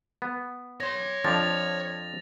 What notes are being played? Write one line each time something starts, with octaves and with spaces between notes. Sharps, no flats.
B3
C#5 C6 A#6
F2 F3 D4 A6 F7